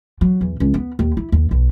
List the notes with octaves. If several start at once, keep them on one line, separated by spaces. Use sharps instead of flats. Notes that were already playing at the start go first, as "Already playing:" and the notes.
F#3
E2
C#2
B3
D#2
E4
D#2
B1